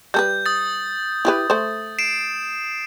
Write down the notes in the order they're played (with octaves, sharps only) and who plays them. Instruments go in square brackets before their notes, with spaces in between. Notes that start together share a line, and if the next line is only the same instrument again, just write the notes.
[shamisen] G3 A4 B4 [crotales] G6
[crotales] D#6 A6
[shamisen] E4 G4 B4
A3 C5
[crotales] C7 D7 E7